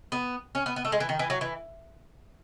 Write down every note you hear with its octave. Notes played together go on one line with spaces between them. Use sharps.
B3
C#4
B3
B3
A3
G#3
E3
D#3
E3
F#3
E3